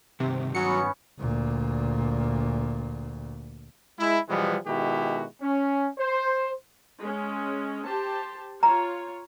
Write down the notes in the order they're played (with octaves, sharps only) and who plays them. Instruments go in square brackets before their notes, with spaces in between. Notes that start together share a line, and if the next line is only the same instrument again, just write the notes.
[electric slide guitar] G2 D#3 [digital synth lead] C3
[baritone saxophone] F#3 [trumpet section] B3 C#4 [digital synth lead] C#7
[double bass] D2 A#2
[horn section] G#3 E4
B2 E3 F3 G3 G#3 B3
B2 D#3 G#3 E4 F#4 G4
C#4
C5
[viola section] G#3 C#4
G4 C5 A5
[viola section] F4 C#5 [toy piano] A#5